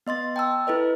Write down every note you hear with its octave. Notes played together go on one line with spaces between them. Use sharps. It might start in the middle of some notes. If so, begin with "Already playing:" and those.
B3 D#5 C6 A6
G5 A5 E6
E4 A4 B4 D#5